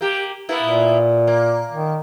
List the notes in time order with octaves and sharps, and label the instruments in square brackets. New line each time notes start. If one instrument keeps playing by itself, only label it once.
[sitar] A#3 G4
A#3 B3 E4
[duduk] A#2
[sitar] A#3
[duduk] D#3